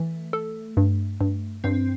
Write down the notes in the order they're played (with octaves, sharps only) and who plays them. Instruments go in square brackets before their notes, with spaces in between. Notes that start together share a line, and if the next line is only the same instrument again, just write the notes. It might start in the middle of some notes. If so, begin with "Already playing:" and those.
Already playing: [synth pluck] E3 [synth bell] A3
[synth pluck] A4
G2
G2
[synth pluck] G2 [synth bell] C4